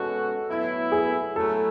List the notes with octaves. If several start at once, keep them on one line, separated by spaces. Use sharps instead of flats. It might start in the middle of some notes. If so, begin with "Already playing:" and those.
Already playing: B2 G#3 C#4 F#4 A4
A2 F#3 B3 E4
G#4
F#3 A3 E4 A4